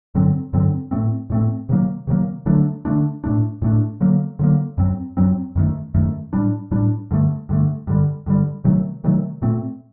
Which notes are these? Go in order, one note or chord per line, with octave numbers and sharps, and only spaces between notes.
G2 D3 F#3 C4
G2 D3 F#3 C4
A2 A3 C4
A2 A3 C4
C3 D#3 F#3 A#3
C3 D#3 F#3 A#3
D3 F#3 A3 D4
D3 F#3 A3 D4
A2 A3 D4
A2 A3 D4
D3 F#3 A#3
D3 F#3 A#3
F#2 F#3 C4
F#2 F#3 C4
F#2 D#3 A3
F#2 D#3 A3
A2 G3 D4
A2 G3 D4
G2 D3 A3
G2 D3 A3
G2 D3 G3
G2 D3 G3
C3 D#3 F#3 A3
C3 D#3 F#3 A3
A#2 A3 C4